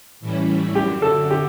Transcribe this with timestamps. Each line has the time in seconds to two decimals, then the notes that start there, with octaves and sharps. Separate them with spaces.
0.20 A2 E3 G3 C#4 E4
0.75 F#2 D3 F#3 G4
1.02 A4
1.31 G4